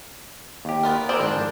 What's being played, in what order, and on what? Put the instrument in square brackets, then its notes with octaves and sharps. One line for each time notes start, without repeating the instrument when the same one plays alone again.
[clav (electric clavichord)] D#2 G4
[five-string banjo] B3 F4 A#4
[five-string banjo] C4 G#4 C5 [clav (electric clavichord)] A#4 D5
[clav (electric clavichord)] G#1 G#2 [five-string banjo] D4 C5
[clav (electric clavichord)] F3